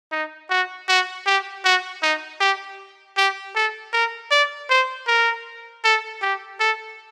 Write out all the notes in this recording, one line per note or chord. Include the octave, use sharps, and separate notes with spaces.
D#4
F#4
F#4
G4
F#4
D#4
G4
G4
A4
A#4
D5
C5
A#4
A4
G4
A4